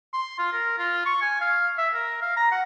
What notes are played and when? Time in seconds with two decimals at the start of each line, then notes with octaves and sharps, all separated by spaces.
0.13 C6
0.39 F4
0.52 A#4
0.78 F4
1.05 C#6
1.21 G#5
1.41 F5
1.78 E5
1.94 A#4
2.22 F5
2.36 A#5
2.52 F#5